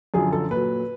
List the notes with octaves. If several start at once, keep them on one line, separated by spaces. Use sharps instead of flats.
F#2 D3 F3 G#4
A4
A#2 F#3 B4